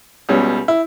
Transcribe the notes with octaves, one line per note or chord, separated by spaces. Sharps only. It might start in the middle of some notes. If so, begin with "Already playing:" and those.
C#2 B2 G3 C#4
E4